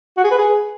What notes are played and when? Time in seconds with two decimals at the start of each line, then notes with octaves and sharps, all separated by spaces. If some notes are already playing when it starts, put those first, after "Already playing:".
0.17 F#4
0.24 G#4
0.31 B4
0.38 G#4